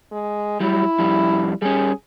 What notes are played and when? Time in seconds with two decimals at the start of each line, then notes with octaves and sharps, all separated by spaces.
0.12 G#3
0.60 F#3 G3 E4
0.99 F2 G3
1.62 G3 C#4 G#4